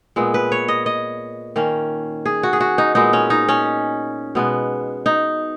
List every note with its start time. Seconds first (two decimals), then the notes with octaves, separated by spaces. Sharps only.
0.16 A#2 G#3 B3
0.34 B4
0.52 C#5
0.68 D#5
0.86 D#5
1.56 D#3 A#3 C#4
2.26 G#4
2.43 F#4
2.53 G#4
2.60 F#4
2.78 D#4
2.95 A#2 G#3 B3 D#4
3.13 C#4
3.30 D#4
3.49 C#4
4.35 B2 G#3 B3
5.06 D#4